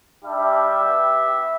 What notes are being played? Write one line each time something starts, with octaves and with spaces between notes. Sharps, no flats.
G3 D4 G4 E5
B3 G4